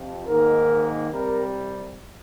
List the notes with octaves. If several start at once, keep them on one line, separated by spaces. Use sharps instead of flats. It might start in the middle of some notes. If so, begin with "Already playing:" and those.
Already playing: F2 C3 F3
G#2 D#3 A#3 A#4
C2 C3 G3 A#4